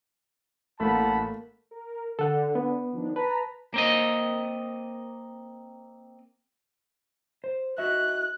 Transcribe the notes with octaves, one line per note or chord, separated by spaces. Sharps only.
A1 A3 A#3 F#5 A5 B5
A#4
D3 A4 F#5
B3
D#3 F3 D4
B4 A5 A#5 B6
A#3 C4 D#5
C5
F#4 D#5 E5 F#6